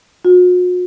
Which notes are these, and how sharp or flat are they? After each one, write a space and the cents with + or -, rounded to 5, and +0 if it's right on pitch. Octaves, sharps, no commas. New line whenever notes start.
F#4 -45